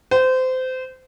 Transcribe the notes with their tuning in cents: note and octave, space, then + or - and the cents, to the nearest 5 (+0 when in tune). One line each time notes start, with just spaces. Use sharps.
C5 -25